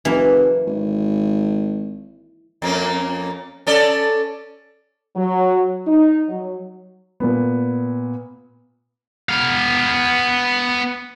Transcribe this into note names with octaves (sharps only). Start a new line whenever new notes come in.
F#1 E3 A#3
G#1
F2 A#3 C#4
C#4 A4 D5
F#3
D#4
F#3
A#2 B3
B3 F5